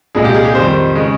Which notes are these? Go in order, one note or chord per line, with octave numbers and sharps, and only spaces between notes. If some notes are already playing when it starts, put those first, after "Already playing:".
C2 A#2 G#3 G#4
G4
G#4
G4
F2 D#3 G3 C5
C#3 G#3